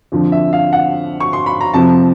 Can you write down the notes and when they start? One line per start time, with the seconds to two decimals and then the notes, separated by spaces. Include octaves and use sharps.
0.12 F2 D3 F3
0.32 E5
0.53 F5
0.73 F#5
1.20 C#6
1.33 C6
1.46 B5
1.61 A#5
1.74 F2 C3 F3 A5